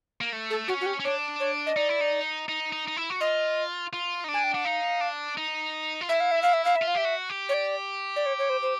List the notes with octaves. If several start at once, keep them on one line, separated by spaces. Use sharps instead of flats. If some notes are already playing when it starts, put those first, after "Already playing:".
A#3
A3
A4
C#4 F#4
F#4
G4
C#4
D4 C#5
C#5
D#5
D#4 D5
E4
D#4
D#4
D#4
D#4
E4
F#4
F4 D#5
F4
D#4
D4
G#5
G5
D4 F#5
D#4 F5
D4
D#4
F4
E4 E5
F5
E5
F5
E5
F5
E5
F4
F5
G4 E5
F#4
G4
C#5
D5
D5
C#5
C#5
C5
C5